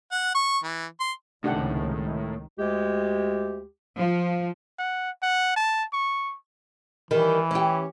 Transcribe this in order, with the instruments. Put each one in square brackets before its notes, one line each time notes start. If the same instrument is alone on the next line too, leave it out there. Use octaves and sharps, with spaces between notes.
[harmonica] F#5
C#6
E3
C6
[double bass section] C#2 C3 G#3 [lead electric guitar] A2 [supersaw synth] D#3 [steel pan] D4 G4 F#5
[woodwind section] D2 G#3 G4
[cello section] F3
[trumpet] F#5
F#5
A5
C#6
[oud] D#3 G3 [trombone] E3
[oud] C#4 G4